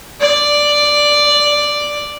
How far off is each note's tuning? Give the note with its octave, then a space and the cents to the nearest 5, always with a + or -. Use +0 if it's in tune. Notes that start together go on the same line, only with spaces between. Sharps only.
D5 +5